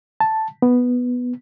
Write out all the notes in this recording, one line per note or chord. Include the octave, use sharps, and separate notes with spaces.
A5
B3